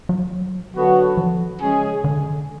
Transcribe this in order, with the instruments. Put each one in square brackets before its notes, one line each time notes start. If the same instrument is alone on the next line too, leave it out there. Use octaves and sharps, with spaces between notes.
[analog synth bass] F#3
[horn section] D3 F#3 B3 F#4 A4
[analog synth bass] F3
[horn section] C#3 G#3 C#4 G#4
[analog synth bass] D3